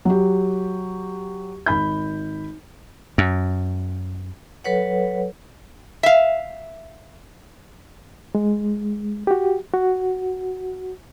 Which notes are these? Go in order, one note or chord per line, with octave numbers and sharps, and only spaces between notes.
F#3 G4
G#1 B5 G6
F#2
F#3 A4 B4 C#5 F#5
E5 F5
G#3
F#4 G4
F#4